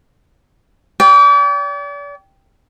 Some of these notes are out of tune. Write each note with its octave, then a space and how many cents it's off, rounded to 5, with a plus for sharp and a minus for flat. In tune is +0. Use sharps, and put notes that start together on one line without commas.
D5 -40 G5 +0